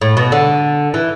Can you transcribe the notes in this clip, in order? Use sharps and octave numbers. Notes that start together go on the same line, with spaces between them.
A2
B2
D3
E3